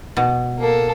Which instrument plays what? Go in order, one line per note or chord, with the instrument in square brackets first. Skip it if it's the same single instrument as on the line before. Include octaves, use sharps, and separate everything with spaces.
[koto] B2
[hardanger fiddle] A#3 A4